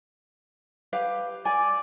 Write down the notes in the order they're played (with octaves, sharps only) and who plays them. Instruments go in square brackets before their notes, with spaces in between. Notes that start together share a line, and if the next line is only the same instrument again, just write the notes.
[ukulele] G4 B4 F5
[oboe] D5 [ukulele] G#5